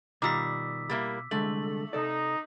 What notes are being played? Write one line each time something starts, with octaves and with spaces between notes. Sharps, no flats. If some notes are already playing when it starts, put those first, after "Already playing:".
B2 D#3 G3 F4 D6 E6 B6
G3 A#3 E4
C2 D3 G#3 A3 F#7
C3 D#4 A4 D5